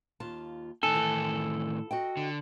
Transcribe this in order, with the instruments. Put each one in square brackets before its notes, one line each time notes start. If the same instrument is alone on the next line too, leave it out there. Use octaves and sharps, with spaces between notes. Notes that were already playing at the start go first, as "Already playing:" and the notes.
[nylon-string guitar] D#2 F4 A5
[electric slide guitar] A2 D#3 G#5 [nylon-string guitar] D#4 [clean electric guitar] A4
[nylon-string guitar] E3
F#4 D#5 G5
[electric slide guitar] D3